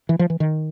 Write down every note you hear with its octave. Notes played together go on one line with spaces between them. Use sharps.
E3
F3
E3
D#3